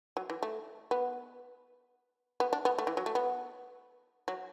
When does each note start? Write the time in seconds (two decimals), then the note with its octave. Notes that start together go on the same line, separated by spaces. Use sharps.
0.17 F#3
0.30 E3
0.43 A3
0.91 B3
2.40 B3
2.53 D4
2.65 B3
2.78 A3
2.87 E3
2.97 F#3
3.06 A3
3.15 B3
4.28 F#3